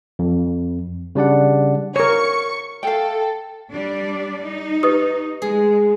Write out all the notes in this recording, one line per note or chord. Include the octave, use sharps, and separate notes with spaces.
F2
C#3 G3 D4 D5 F#5
A#4 C#5 C#6 C#7
A4 F5 G5
G3 D4 D5
D#4
G4 B4 D#5 D#6
G#3 G#4